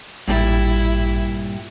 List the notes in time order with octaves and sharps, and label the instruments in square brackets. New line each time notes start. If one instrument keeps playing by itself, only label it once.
[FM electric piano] A1 [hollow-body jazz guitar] G2 A#2 G3 [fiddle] E4